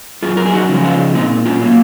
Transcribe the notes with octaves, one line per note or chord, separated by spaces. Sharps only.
F#2 F4 G#4
A#4
G#4
D#4 F#4
C#3 F3 G#3
C#4 F4
A#2 C4 D#4
C#4 F4
F#3 A#3